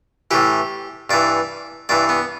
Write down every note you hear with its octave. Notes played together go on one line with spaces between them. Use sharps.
A2 E3 G4
G2 E3 D5
G2 E3 D5
B3